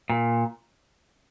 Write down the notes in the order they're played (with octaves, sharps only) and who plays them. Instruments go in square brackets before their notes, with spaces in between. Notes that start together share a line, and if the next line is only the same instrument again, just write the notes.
[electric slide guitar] A#2